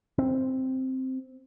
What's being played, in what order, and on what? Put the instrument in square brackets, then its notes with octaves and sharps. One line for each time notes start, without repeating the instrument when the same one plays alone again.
[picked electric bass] C4